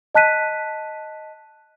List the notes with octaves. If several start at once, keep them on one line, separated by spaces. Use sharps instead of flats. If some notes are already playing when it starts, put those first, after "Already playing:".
D#5 A5 F#6 B6 D#7